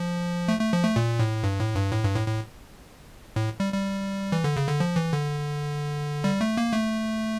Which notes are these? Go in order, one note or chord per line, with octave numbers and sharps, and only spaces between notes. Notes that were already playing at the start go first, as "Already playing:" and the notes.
Already playing: F3
A3
A3
F3
A3
A#2
A2
G2
A2
G2
A2
G2
A2
A2
A2
G3
G3
E3
D3
C#3
D3
F3
E3
D3
G3
A3
A#3
A3